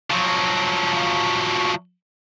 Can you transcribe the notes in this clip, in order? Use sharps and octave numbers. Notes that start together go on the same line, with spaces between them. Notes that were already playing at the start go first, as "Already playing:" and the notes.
F3 F#3